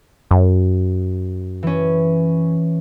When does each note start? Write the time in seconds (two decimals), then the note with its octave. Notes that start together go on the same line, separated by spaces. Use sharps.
0.31 F#2
1.63 E3 C#4